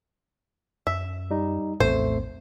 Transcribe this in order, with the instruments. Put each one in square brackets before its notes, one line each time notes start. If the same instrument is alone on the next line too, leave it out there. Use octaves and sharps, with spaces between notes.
[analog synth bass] F#2 [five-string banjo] E5
[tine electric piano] G3 D#4
[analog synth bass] A#1 [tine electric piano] E2 A3 [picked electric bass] A2 C4 [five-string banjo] C5